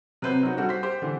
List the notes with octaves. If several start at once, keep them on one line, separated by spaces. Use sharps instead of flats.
C3 F#3 B4 C5 G6
F#3 C4 D#4 F#4
G3 D4 F#4 A4
C5 B6
G4 C5
D3 E3